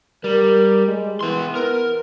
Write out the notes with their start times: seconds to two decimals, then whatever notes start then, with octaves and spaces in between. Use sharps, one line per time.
0.24 G3 A#4
0.87 G#3
1.21 E3 B3 C6
1.55 B3 A#4